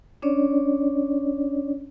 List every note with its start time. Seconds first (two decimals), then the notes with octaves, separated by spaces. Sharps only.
0.22 C#4 D4 C#5 D5